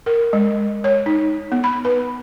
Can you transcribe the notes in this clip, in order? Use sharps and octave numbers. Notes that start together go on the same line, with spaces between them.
A#4
G#3
C#5
D#4
B3
B5
B4